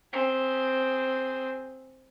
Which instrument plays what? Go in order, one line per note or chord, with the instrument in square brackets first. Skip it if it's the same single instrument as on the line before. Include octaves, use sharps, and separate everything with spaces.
[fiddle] C4 G#4